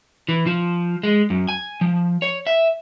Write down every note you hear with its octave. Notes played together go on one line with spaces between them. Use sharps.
E3
F3
G#3
F#2
G#5
F3
C#5
E5